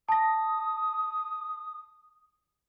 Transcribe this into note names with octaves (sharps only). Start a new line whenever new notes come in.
A5 D#6 A#6